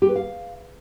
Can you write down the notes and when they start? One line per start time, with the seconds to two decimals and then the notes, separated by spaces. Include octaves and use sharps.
0.02 G4
0.09 B4
0.16 F5